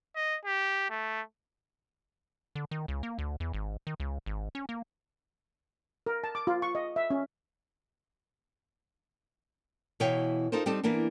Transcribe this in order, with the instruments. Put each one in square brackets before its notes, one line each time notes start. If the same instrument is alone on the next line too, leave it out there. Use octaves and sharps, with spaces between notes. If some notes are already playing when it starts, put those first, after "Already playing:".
[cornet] D#5
G4
A3
[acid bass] D3
D#3
C#2
A#3
D2
E2
G#1
D#3
C#2
G#1
C#4
A#3
[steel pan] A#4
A5
D6
F4
C#6
D#5
E5
C#4
[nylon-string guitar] B2 E3 E4 C#5 F5 G5
D#4 F4 A4 A#4 C5
G3 C4 D#4 G4 A4
E3 A#3 B3 D4